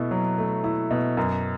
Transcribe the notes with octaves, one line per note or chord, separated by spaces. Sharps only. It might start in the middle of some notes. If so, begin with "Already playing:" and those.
Already playing: B2 A3 E4
F#3
A3
E4
B2
F#2